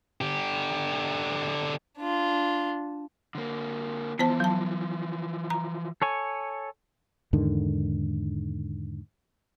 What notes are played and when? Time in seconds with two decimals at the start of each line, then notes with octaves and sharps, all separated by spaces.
0.21 D3 G4
1.98 D4 F4
3.35 D3 A#3
4.19 E3 F3 B3 C5 A5
4.40 F#3 A5
5.50 A#5
6.02 A4 C#5 G#5
7.33 E2 G#2 D3 D#3